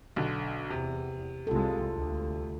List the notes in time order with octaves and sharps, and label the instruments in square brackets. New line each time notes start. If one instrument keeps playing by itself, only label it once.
[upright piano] B1 D3
[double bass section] E2 [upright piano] C3
[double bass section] C2 G#3 [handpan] F4 A4
[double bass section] D2